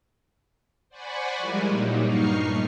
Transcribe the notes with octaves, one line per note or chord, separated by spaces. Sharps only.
C5 D5 F#5 G#5 B5 C#6
F3 G3 G#3 E4 G4 A#4
A#2 F#3 G3 A#3 D#4
G2 D#4 C#6 F6 C7
A#2 A3